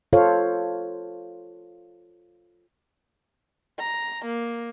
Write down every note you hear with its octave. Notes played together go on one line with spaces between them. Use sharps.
F4 A4 C5 C#5 F5
A#5
A#3